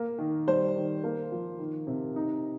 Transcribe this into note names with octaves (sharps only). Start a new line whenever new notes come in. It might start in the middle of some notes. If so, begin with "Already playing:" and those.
Already playing: A#3
D#3
G3 C5
D#3
A#3
F3
D#3
C3
D#4